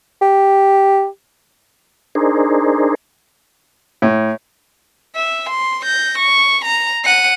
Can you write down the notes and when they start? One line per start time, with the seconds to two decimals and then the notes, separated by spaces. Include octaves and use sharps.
0.22 G4
2.15 D4 D#4 G#4 A#4 C5
4.02 A2
5.16 E5
5.49 C6
5.84 G6 A#6
6.18 C#6
6.65 A#5
7.05 F#5 D#7